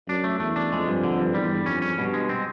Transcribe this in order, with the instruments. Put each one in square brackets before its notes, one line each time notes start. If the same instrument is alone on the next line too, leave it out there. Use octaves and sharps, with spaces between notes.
[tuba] F#2 [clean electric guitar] D4
[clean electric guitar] A3
[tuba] E2 [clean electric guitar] A3
[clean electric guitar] D4
[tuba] F2 [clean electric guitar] G#3
[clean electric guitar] G2
D3
G2
[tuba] E2 [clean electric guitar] G3
[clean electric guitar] G2
[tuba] F2 [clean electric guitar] C#4
[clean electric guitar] C#4
[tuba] G2 [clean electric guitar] B2
[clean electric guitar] G#3
C4